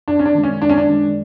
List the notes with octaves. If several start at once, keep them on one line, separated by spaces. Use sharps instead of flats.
F#2 D4
C#4
D4
D#3 G#3
C#4
F#2 D4
C#4
D4
D#3 G#3